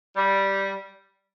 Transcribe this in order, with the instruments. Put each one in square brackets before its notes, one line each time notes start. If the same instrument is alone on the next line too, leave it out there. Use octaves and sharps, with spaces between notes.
[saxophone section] G3